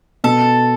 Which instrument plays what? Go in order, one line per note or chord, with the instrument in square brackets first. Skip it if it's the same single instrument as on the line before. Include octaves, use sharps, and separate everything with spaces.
[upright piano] B2 [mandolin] A4